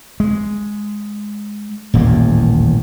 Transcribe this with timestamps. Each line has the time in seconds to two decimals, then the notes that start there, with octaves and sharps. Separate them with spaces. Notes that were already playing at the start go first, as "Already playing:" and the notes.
0.20 G#3
1.94 D#1 A1 E2 A#3